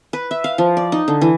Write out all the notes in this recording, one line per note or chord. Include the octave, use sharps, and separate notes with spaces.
B4
E5
F5
F3
D5
D#4
D3
E3